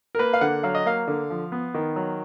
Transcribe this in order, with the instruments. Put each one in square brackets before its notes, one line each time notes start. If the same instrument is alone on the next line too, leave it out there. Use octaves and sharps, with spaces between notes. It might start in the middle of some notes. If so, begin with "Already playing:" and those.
[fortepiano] A#4
A#3 B4
F5
D3 F#5
F#3 F5
D#5
A#3 F5
D3
F3
B3
D#3
F#3